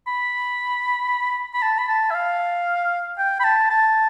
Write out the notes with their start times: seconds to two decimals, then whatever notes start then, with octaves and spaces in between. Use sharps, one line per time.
0.07 B5
1.54 B5
1.62 A5
1.78 B5
1.88 A5
2.11 E5
2.14 F5
3.18 G5
3.40 B5
3.44 A5
3.70 A5